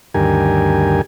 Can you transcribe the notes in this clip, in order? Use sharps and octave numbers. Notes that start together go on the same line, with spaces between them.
D2 G2 D#3 G4 A#4 G#5